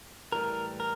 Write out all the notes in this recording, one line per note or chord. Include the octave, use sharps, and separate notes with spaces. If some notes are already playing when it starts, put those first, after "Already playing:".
A2 E3 G3 A#4
A#4